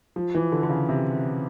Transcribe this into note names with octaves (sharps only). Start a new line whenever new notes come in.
F3
E3
D3
D3
C#3
C3